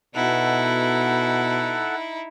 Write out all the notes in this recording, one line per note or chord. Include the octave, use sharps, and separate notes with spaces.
B2 D#4 E4 A4 F#5